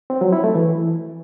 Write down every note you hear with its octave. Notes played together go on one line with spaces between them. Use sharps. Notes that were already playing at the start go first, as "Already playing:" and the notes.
C4
F#3
E4
A3
E3